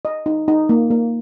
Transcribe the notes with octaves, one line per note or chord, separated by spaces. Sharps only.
D#5
D#4
D#4
A#3
A#3